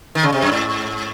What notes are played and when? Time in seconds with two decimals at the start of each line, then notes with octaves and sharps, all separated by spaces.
0.15 D#3
0.23 C#3
0.32 C3
0.42 F#2
0.52 G#2